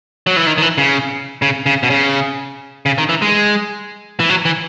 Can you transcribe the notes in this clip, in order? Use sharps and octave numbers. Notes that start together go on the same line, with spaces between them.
F#3
E3
D#3
D#3
E3
C#3
C#3
C#3
B2
C#3
C#3
D#3
E3
G#3
E3
F#3
E3